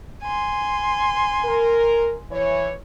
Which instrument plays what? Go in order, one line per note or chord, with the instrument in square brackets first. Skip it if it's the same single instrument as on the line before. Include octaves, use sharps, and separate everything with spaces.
[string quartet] G#5 C6
[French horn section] A#4
E3 C#5